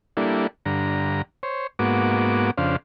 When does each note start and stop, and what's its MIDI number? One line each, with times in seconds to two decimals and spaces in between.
0.17 0.47 55
0.17 0.47 58
0.17 0.47 62
0.17 0.47 64
0.17 0.47 69
0.66 1.22 43
0.66 1.22 50
0.66 1.22 82
1.43 1.67 72
1.43 1.67 73
1.79 2.51 44
1.79 2.51 58
1.79 2.51 59
1.79 2.51 66
1.79 2.51 86
2.58 2.76 41
2.58 2.76 49
2.58 2.76 62
2.58 2.76 72
2.58 2.76 77